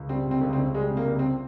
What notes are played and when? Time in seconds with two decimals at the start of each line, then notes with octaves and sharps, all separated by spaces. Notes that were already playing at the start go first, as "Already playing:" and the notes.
Already playing: C#2
0.09 G3 C4
0.26 C3
0.31 C4
0.41 C#2
0.53 C4
0.58 C#2
0.75 G3 G#3
0.91 C3
0.97 A#3
1.08 C#2
1.19 C4